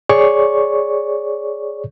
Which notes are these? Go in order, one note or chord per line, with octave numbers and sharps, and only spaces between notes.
G#4 C#5 D5 C#6